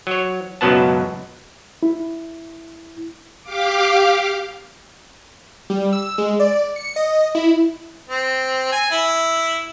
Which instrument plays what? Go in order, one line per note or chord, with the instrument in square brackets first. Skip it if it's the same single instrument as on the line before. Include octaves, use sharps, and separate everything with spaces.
[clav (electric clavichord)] F#3 C#5
C#2 F#2 B2 F#3 B3 A5
[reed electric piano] E4
[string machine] G4 F5 D6
[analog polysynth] G3
E6
G#3
D5
C#7
D#5
E4
[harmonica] C4
G#5
E4